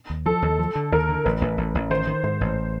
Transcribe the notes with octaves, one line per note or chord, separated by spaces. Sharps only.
D#2
F3 A4
D#2
F3
D3
D#2 A#4
D3
A1 B4
A1
A1
A1
D#3 C5
D#3
G#2 C5
A1